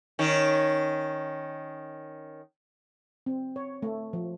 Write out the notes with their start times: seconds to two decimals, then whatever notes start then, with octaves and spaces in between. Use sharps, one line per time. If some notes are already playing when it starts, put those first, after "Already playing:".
0.19 D#3 C#4
3.26 C4
3.56 C#5
3.82 A3
4.13 F3